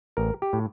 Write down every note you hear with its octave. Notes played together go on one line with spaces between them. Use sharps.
A1 A#4
G4
A2